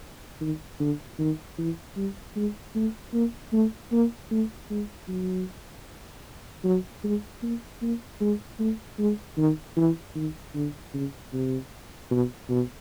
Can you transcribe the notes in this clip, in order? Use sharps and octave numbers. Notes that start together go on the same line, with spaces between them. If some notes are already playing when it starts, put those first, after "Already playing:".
D#3
D3
D#3
E3
G3
G#3
A3
A#3
A3
A#3
A3
G#3
F#3
F#3
G#3
A#3
A#3
G#3
A3
G#3
D#3
E3
D#3
D3
C#3
C3
B2
B2